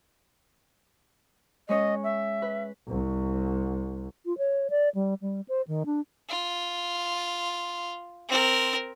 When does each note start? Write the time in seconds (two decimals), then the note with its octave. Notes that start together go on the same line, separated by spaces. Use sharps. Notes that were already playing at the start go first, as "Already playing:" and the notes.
1.69 G#3 C#4 C#5 D#5
2.04 E5
2.42 B4
2.88 C2
4.26 F4
4.38 C#5
4.70 D5
4.95 G3
5.22 G3
5.49 C5
5.68 D#3
5.86 D4
6.29 F4
8.29 C4 A#4